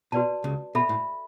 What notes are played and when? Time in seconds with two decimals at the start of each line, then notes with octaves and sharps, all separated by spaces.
0.12 B2 F#4 B4 D5 A5
0.44 C#2 C#3
0.75 B2 A4 E5 B5
0.89 A2